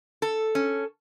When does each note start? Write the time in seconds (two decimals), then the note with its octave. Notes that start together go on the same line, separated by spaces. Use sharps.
0.22 A4
0.55 C#4